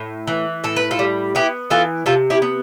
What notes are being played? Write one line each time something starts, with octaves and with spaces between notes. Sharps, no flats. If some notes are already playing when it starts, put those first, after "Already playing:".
Already playing: A2
E3
A2 A4
B4
F4 A4
G3
B3 E4 G4
E3 F4 A4
C3 F4 A4
E4 G4
B3